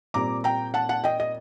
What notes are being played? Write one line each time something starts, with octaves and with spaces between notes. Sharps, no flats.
A#2 G3 C4 A#5 D6
G5 A#5
F#5 A5
F#5 A5
D#5 G5
D#5